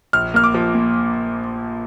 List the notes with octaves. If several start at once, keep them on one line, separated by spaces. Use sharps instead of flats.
A#1 F6
A#3 F6
D6
F3
A#2